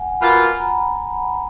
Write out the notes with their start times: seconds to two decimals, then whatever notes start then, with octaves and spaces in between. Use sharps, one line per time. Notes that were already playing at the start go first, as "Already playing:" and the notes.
Already playing: F#5 G#5
0.21 B2 A#3 F4 B5
0.59 A#5